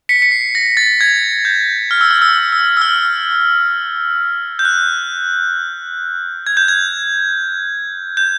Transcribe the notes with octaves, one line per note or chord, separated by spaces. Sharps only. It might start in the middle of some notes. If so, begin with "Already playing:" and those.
B6 C#7
C#7
C7
A#6
A6
G#6
G6
F6
E6
F6
E6
E6
E6
F6
G6
F#6
G#6
G6
G#6
G6